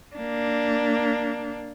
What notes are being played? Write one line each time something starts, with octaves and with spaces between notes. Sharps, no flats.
A#3 D4